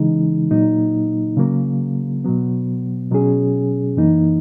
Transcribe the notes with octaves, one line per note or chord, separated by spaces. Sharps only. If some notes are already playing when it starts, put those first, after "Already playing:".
Already playing: C#3 E3 G#3 D#4
A#2 F#3 A#3 D#4
C#3 F#3 A#3
B2 F#3 B3
B2 F#3 C#4 G#4
F#2 E3 A#3 D#4